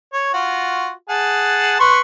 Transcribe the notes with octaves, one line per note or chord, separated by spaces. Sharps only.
C#5
F4 F#4
G#4 F#5 A5
B4 C6 C#6